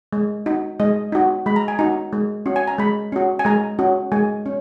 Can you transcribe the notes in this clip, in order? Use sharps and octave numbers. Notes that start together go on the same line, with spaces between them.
G#3
D#4 F#4
G#3 D#5
D#4 F#4
G#3 B5
A#5
G#5
D#4 F#4 A#5
G#3
C#4 F#4
G#5
A#5
G#3 B5
C#4 F#4
G#5
G#3 A#5
C#4 F#4
G#3 G#5
C#4